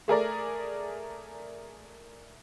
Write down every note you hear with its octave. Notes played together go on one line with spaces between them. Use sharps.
A3 G#4 A#4 D5